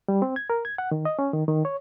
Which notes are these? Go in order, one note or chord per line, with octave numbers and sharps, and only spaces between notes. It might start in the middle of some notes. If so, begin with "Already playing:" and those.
G3
C4
G#6
A#4
G#6
F#5
D#3
D#5
C#4
D#3
D#3
C#5